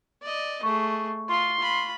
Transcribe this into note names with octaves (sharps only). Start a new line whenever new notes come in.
D5 D#5
A3 G#4 C#6
F4 C6
F4 B5